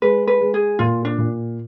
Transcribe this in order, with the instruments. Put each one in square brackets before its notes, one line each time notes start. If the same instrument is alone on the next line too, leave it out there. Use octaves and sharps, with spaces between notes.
[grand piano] G#3 [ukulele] B4
[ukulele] B4
[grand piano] G#3
[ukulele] G#4
[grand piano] A#2 [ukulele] F4
[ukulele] D4
[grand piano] A#2